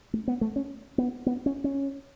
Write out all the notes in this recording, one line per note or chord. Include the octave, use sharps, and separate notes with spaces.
A3
B3
A3
C#4
B3
B3
C#4
C#4